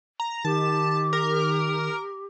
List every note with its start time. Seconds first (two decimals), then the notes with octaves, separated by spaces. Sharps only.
0.20 A#5
0.45 D#3 G4 A5
1.13 A#4